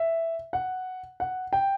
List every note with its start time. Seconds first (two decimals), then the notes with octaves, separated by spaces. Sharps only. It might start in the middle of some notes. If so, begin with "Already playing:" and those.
Already playing: E5
0.53 F#5
1.20 F#5
1.53 G5